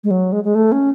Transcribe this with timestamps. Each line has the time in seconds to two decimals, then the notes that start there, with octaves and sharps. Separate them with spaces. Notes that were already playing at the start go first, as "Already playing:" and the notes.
0.04 G#3
0.11 F#3
0.32 G#3
0.44 G#3
0.55 A3
0.72 C#4